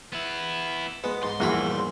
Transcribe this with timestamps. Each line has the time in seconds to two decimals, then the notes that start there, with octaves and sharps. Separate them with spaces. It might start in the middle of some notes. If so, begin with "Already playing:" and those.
0.13 B3 E4
1.04 G#3 B3
1.23 G#2 C6
1.40 A#1 E2 G2 F#4 G#4 B5